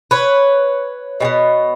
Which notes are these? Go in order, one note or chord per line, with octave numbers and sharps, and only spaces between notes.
B4 C#5
B2 G3 B3